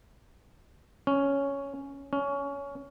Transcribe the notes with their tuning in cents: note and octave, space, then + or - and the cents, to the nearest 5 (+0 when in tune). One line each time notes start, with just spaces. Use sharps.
C#4 +5
C#4 +20